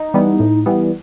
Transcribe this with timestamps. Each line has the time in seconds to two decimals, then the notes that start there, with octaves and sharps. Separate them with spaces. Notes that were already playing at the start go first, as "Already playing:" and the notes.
Already playing: D#4
0.14 E3 G3 B3
0.40 A2
0.66 E3 G3 B3